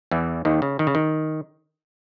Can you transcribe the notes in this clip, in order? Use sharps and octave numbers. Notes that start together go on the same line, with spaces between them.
E2 E3
D#2 D#3
C#3
D#3
C#3
D#3